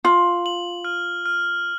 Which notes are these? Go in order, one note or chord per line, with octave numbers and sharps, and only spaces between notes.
F4 F#7
F#7
F6
F6